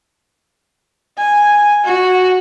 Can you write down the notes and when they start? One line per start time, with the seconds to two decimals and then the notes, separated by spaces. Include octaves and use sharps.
1.18 G#5
1.84 F#4